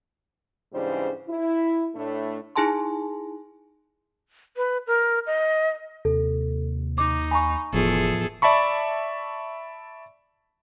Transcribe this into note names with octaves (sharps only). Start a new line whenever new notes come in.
G#2 C#3 E3 G3 D4 C5
E4
A2 A3 D4
D#4 E4 G#4 G#5 A5 C6
B4
A#4
D#5
D#2 C3 A4
D#4 D6
G#5 A#5 B5 C#6
F1 E2 A2 F3 F4 G#4 A4
D5 E5 A5 B5 C#6